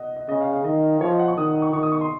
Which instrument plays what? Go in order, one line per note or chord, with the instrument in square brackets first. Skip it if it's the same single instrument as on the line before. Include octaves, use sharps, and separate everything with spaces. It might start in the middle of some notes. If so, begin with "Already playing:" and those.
Already playing: [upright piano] D#5 F#5
D#5
[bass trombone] C#3 [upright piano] D#5
[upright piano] F5
F5
[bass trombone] D#3 [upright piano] D#5
[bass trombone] F3 [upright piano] C#5
[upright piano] D#5
F#5
C#6
[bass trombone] D#3 [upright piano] D#6
[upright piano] C#6
[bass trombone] D#3 [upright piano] C#6
[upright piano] D#6
C#6
C6